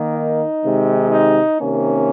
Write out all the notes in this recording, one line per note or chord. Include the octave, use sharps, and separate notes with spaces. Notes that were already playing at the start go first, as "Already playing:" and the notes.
Already playing: D#3 A#3
D#4
C3 D#3 G#3
D#4
C3 D#3 A#3 C#4